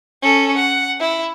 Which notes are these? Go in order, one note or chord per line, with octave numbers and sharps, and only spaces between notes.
C#4 A4
F#5
E4